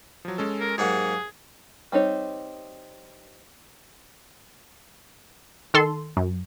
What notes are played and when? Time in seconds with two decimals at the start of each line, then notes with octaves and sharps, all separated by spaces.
0.25 F3 F#3
0.38 G#3 C#4 A4
0.60 A#4
0.78 G#2 F#3 A#3 G4 G#4 F#5
1.92 G3 C4 D#4 C#5
5.74 D#3 A4 C6
6.17 F#2